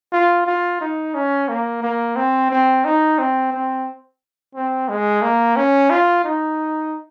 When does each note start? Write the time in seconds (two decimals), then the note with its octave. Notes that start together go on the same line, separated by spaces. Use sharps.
0.12 F4
0.46 F4
0.81 D#4
1.14 C#4
1.49 A#3
1.83 A#3
2.16 C4
2.50 C4
2.85 D#4
3.18 C4
3.53 C4
4.55 C4
4.89 G#3
5.22 A#3
5.56 C#4
5.90 F4
6.24 D#4